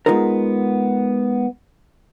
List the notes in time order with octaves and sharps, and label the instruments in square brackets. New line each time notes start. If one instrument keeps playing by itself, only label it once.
[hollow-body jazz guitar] G#3 A#3 B3 D#4 F4 A#4